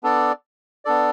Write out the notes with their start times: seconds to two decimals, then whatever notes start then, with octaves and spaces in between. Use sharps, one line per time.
0.03 B3 D4 A4 D5
0.85 B3 D4 A4 D5